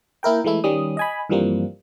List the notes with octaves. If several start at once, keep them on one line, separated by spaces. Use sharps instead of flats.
A#3 E4 A#4 G5
E3 G#3 A3 E4
D#3 G3 C#4 D#6
D#5 G#5 B5
G2 E3 F3 G3 A#3 C4